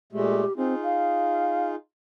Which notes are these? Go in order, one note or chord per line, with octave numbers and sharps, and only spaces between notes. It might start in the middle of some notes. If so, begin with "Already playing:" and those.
A#2 G#3 A3 G4
C4 D#4 F4 G#4
F5